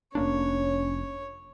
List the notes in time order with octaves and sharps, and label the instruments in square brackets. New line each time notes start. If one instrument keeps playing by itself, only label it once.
[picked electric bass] F1 A#3 D4 [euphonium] C#4 [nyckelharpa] C#5